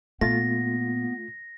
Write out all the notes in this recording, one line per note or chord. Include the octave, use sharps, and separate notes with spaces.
A#2 A3 B3 F4 A6 A#6